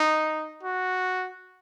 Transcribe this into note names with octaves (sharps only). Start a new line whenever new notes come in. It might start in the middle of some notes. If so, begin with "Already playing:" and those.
Already playing: D#4
F#4